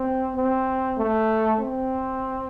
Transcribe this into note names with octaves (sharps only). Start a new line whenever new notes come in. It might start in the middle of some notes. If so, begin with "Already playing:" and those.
Already playing: C4
C4
A3
C4